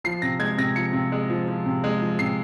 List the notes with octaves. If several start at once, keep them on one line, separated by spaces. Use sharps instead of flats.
F3 C7
C3 A#6
G#3 G#6
C3 A#6
F3 C#7
C3
G#3
F3
F3
C3
G#3
F3
C3 C7